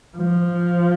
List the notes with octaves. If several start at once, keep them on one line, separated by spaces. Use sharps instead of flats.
F3